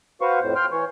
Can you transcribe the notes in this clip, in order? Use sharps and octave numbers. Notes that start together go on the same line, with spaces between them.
F#4 B4 C5 F5 C#6
F2 A2 C5
G5 C6 F6
E3 C#5